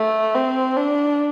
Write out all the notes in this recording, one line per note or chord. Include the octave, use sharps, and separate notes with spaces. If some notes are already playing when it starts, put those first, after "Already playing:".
Already playing: A3
C4
D4